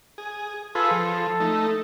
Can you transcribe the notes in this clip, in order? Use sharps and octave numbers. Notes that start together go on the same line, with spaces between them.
G#4
F4 G#4 A4 B4
F3
A3 D#4